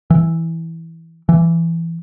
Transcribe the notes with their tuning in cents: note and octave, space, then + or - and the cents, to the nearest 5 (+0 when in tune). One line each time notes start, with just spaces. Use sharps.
E3 -5
E3 +15